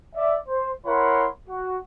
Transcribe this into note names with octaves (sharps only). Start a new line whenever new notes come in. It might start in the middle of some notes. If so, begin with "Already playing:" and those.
D5 E5
C5
E4 A#4 C#5 F#5 B5 C6
F#4